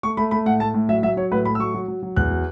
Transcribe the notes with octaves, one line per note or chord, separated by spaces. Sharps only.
A3 C#6
A3 B5
A3 B5
A2 F#5
A3 A5
A2
F#3 E5
F#3 E5
F#3 C#5
A2 B4
A3 B5
E6
F#3 C#6
F#3
F#3
F#3
E2 F#6
F#3